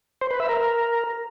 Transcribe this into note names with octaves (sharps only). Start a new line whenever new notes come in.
C5
B4
E5
A#4